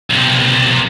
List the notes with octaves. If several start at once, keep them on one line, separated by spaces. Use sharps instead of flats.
B1 C3